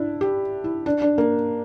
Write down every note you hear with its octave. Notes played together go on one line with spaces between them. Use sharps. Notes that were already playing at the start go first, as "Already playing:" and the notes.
Already playing: D4 E4
G4
E4
D4
D4
A#3